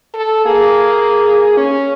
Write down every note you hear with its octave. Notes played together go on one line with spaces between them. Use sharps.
A4
A#3 G#4
C#4